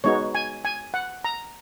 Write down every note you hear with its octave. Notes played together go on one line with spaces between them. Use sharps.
G#3 B3 D#4 F#4 C#5
G#5
G#5
F#5
A#5